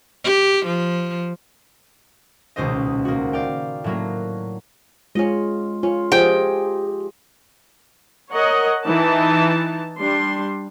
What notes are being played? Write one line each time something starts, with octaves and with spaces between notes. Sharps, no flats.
G4
F3
D#1 C#2 B2 C5 D#5
A#3 F#4
D5 F5 G5
A2 F#3 A#3
G#3 C#4 F4 D#5
C#4 F4
F3 G4 G#4 D#5 G5
A#4 C#5 D#5 F#5
E3 D#4 A5
G3 D4 C6